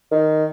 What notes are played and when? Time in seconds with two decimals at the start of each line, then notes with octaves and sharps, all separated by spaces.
0.11 D#3